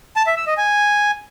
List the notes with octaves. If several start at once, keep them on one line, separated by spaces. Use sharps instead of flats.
A5
E5
E6
D#5
G#5